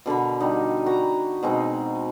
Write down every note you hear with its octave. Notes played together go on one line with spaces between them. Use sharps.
B2 D3 A#4 B5
D3 G3 D#4
F#4 B4 A#5
B2 G#3 C4 D#4